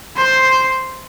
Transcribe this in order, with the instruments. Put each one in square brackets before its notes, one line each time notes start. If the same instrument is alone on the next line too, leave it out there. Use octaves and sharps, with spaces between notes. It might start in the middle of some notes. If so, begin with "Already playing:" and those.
[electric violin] C5